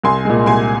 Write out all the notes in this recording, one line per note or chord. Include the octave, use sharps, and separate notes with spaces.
C2 G#5 C6
A#2 G#3
C2 G#5 C6